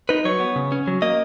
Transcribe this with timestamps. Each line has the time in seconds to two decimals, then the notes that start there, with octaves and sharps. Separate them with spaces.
0.09 D#4 B4
0.25 F#3 C#5
0.40 B3
0.56 C#3
0.72 C#4
0.87 F#3
1.02 A#3 D#5